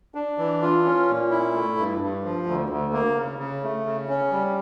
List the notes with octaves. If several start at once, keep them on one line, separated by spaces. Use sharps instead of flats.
D4
E3
F4
C#4
A#2
E4
A3
G2
G2
F3
D2
D2
A#3
C#3
C#3
A3
C#3
C#4
G3